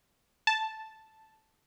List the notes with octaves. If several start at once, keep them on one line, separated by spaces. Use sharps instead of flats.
A5